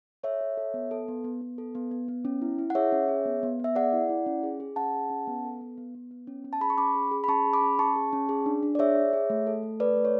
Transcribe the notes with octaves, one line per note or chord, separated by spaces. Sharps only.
A4 C#5 E5
A4
A4
B3
A4
B3
B3
B3
A4
B3
B3
B3
C#4
E4
E4
F#5
G#4 C#5 E5
C#4
G#4
B3
B3
B3 E5
G#4 D5 F#5
E4
E4
C#4
G#4
G#4
C#4 F#5 A5
G#4
C#4
B3
A4
B3
B3
B3
B3
C#4
C#4
A5
G#4 B5
C#6
C#4 B5 D6
G#4
G#4
B5
C#4 A5 C#6
G#4
B5 D6
C#4
C#4 A5 C#6
G#4
C#4
G#4
D4
D4
D5
G#4 C#5 E5
G#4
G#4
A3
A4
A3
A4 B4 D5
A3
C#5